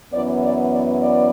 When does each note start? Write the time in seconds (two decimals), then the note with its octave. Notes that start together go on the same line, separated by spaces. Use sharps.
0.13 F#2 E3 B3 D5
0.44 D5
0.73 D5
1.02 D5